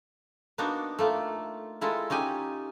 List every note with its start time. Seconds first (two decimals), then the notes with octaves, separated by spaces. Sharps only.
0.58 A#3 B3 D4 D#4 F#4 A#4
0.99 A3 A#3 F4
1.81 G#3 E4 F4 A4 A#4
2.10 C#4 D#4 G4 G#5